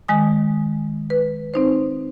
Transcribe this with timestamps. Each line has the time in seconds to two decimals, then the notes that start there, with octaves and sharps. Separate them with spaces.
0.08 D#3 G#3 G#5 D#6
1.10 B4
1.54 C4 D#4 C5